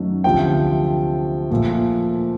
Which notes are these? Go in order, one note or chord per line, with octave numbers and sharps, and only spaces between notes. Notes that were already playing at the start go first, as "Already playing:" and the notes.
Already playing: F#2 D#3 F#3 A3
D2 C3 F3 A3 G5
A#2 F3 A3